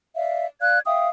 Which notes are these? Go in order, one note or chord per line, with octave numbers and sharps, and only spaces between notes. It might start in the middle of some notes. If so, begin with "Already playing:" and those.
D5 E5 F5
D5 F5 F#6 G#6
E5 F5 G5 D#6